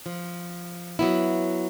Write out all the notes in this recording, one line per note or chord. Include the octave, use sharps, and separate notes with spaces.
F3
F#3 B3 E4